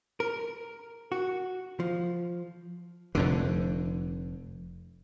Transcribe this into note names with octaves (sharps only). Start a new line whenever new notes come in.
A#4
F#4
F3
F1 F2 D3